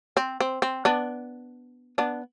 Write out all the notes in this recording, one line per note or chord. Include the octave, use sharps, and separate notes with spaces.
C4
C4
C4
B3 D4
B3 D4